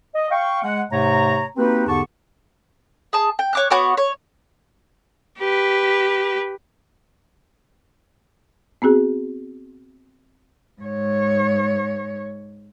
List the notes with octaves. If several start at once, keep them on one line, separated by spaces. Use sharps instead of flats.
D#5
F5 G5 C#6
G#3 F#5
G#2 C3 A3 C#5 A#5
A#3 C4 D#4 F#4 G4 B4
E2 G#2 D3 G4 A5 C#6
G#4 A5
G5
C#5 D6 F#6
B3 F#4 C#5 D6
C#5
G4 B4
B3 C4 F#4 G#4
G#2 C#5